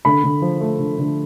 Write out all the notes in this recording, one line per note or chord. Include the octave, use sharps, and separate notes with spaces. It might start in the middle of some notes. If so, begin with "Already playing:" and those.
D3 B5
D3
F3
A3
D3
D3